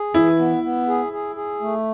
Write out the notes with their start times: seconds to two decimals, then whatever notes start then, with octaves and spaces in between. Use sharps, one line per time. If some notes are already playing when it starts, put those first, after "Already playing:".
Already playing: G#4
0.14 E3 E4
0.38 B3
0.63 B3
0.88 G#4
1.12 G#4
1.36 G#4
1.61 A3